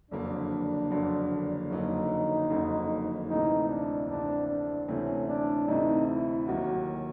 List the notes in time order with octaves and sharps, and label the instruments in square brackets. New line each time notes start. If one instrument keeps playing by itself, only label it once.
[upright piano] F#1 F2 D3 F#3 A#3 [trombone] D4
[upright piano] F#1 F2 D3 F#3 A#3
[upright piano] F#1 F2 D3 F#3 A#3 [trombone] D#4
[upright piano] F#1 F2 D3 F#3 A#3
[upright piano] D2 C3 E3 A3 C4 [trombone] D#4
[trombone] D4
[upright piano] D2 C3 E3 A3 C4 [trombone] D4
[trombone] D4
[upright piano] D2 C3 E3 A3 C4 [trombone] C#4
[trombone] D4
[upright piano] D2 C3 E3 A3 C4 [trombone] D#4
[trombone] E4
[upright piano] D#2 D#3 F#3 A#3 [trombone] F#4